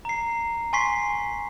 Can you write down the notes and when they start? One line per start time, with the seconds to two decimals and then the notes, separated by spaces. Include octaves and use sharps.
0.05 A#5 C7
0.73 G#5 C6 C#6 B6 C7